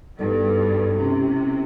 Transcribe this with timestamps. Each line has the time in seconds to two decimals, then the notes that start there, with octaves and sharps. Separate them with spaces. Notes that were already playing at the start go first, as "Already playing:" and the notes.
0.19 G2 B3 D#4 F#4 A4 C5
0.97 C3 G#3 C#4 E4 G4